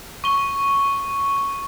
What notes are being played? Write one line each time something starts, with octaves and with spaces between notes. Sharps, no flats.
C#6 G7